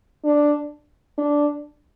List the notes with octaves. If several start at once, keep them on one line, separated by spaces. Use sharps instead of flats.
D4
D4